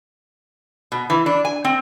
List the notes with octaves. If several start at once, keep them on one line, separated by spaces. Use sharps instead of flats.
B2
E3
D4
G#5
C4